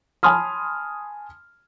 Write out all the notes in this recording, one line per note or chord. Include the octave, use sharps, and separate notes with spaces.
G#5 A5 B5 C6 D#6 F6